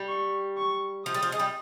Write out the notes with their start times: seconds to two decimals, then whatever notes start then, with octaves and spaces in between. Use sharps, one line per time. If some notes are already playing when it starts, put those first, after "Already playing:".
Already playing: G3
0.08 C#6
0.57 C#6
1.06 F3 D#6
1.14 G3
1.23 F3
1.32 G#3
1.39 G3